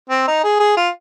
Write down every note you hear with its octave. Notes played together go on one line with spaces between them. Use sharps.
C4
D#4
G#4
G#4
F4